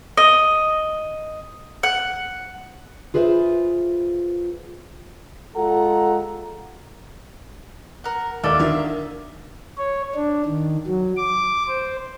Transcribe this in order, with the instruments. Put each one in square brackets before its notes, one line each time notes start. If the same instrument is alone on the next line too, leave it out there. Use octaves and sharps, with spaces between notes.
[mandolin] D#5
F#5
[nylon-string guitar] F4 G#4 B4 C5 D5 E5
[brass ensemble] G#3 F4 A4 F#5 A#5
[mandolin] A#4 F#5
[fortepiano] D#2 [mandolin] A4 D5 E5
[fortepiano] D3 D#3 [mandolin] E5 F5
[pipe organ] C#5
D4
D#3
F#3
D6
C5